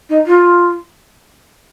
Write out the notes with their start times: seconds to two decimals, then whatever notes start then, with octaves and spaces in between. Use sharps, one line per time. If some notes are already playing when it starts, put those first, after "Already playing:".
0.09 D#4
0.26 F4